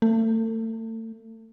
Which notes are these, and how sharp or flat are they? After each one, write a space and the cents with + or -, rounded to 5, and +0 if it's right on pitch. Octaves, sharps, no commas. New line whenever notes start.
A3 +35